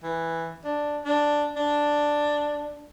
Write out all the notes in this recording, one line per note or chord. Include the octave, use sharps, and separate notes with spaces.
E3
D4
D4
D4